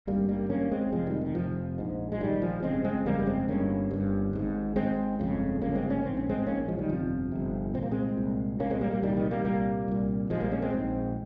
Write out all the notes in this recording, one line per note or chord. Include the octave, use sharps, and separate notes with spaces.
G#1 G2 G3 A#3
G3 A#3
G#1 G2 A#3 C#4
G#3 C4
F1 F2 C3 F3 G#3
D#3 G3
D#3
F1 F2 C3 F3
A#1 G#2
G#3
A#1 G#2 D#3 G3
F3 G#3
G1 F2 C#3 G#3 C4
G#3 C4
G1 F2 C#3 G3 A#3
A#3
G#3 C4
G1 G2 A#3 C#4
G1 G2
G#1 G#2
G#2 G#3 C4
G#1
G1 F2 C#3
G1 F2 C#3 A#3 C#4
G#3 C4
A#3 C#4
A#1 G#2 C4
C#4
G#3 C4
A#1 G#2 A#3 C#4
F3 G#3
D#3 G3
G1 F2 C3 F3
G1 F2 C3
C2 A#2 C4
A#3
G#3 C4
C2 A#2
C2 A#2 A#3 C#4
G#3 C4
G3 A#3
G3 A#3
C2 A#2 D#3 G3
D#3 G3
G3 A#3
C2 A#2 G3 A#3
C2 A#2
A#1 G#2 F3 G#3
G3 A#3
A#3 C#4
G#3 C4
A#1 G#2